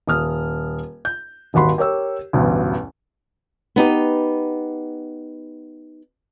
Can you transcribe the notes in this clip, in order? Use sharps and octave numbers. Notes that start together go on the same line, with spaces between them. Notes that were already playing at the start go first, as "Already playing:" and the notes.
D#1 D#6 F6
G6
D#1 G#1 F#4 B5 C6
G4 A#4 C#5 E6
A1 D2 G2 B2
B3 D#4 G4